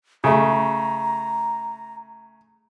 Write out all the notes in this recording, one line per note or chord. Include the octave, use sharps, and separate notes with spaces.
C#3 A3 A#5